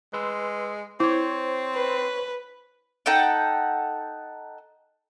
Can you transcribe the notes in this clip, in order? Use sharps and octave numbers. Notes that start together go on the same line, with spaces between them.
G#3 B4 C6 E6
C4 E4 C5 C#5
B4
D#4 A4 F#5 G5